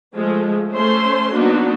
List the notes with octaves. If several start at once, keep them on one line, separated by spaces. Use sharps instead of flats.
F3 G#3 A3
A3 C#4 C5 C6
F#3 A#3 B3 D4 D#4 F#4